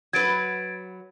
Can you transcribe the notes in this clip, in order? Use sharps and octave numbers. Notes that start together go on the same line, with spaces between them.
F#3 B4 G#6 A6 D7